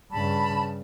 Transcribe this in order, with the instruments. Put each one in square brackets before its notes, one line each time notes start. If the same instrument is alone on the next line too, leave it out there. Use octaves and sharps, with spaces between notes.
[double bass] G2 C#3 [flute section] A5 B5